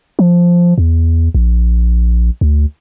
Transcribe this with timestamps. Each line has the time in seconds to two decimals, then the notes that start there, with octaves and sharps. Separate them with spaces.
0.19 F3
0.78 E2
1.35 A#1
2.41 D2